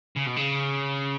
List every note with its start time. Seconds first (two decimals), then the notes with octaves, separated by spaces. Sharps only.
0.17 C#3
0.27 B2
0.37 C#3